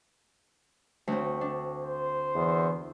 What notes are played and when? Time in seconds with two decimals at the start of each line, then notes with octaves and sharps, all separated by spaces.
1.08 D2 C4
1.41 D4
1.83 C5
2.35 E2